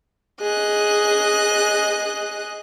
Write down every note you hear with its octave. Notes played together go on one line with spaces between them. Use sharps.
G#4 D#5 F#6